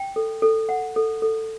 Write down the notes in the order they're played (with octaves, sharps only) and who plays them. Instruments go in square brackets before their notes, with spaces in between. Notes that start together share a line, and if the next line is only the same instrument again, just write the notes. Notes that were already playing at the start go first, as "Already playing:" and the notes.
Already playing: [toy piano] G5
A4
A4
F#5
A4
A4